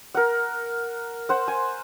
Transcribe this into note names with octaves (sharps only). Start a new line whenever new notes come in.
A#4 F#5
C5 F#5
G#5